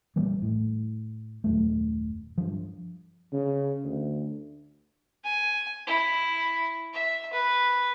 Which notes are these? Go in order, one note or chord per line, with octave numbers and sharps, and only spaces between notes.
A#1 E3 G3 A#3
A2
D#1 F#2 A3
G2 F3
C#3
D2
G#5
E4
E5
B4